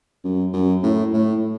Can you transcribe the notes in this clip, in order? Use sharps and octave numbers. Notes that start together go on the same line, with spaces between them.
F#2
F#2
A2
A2